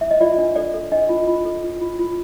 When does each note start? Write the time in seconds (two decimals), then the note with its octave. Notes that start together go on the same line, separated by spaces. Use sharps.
0.01 E5
0.11 D#5
0.20 F4 D5
0.38 D4
0.56 A4 D5
0.74 A4
0.92 D4 D#5
1.09 F4
1.27 F4
1.45 A4
1.63 F4
1.81 F4
1.99 F4